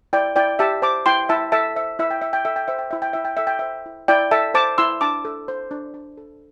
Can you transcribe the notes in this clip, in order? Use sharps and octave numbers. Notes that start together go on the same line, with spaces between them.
E4 D5 G5
E4 D5 G5
G4 E5 A5
C5 A5 D6
E4 G5 C6
E4 E5 A5
A4 E5 A5
C5 E5
E4 E5
G5
E4 E5
G5
A4 E5
G5
C5 E5
G5
E4 E5
G5
E4 E5
G5
A4 E5
G5
C5 E5
E4
E4 D5 G5
A4 E5 A5
C5 A5 D6
E4 C6 E6
D4 A5 D6
A4
C5
D4
D4
A4